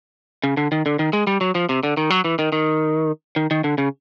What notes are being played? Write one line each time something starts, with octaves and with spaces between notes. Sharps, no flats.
C#3
D3
D#3
D3
D#3
G#3
G3
F#3
F3
C3
D3
D#3
F#3
E3
D#3
D#3
D#3
D#3
D3
C#3